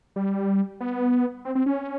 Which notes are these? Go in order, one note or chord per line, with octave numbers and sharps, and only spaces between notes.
G3
B3
C4
C4
C#4